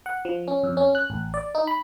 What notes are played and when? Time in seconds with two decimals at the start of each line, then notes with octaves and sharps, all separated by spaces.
0.06 F#5
0.25 F3
0.48 C#4
0.63 F2
0.77 C#4
0.95 F#6
1.10 A1
1.34 D5
1.55 D#4
1.67 B5